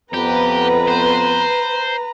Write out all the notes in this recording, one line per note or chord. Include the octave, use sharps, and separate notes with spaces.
F2 B3 G4 B4 A#5
C5